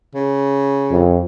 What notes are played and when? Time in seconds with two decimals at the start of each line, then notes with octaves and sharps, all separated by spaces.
0.15 C#3
0.91 F2